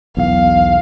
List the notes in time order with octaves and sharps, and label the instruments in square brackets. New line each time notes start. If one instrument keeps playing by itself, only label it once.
[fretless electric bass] B1 E2 [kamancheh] F5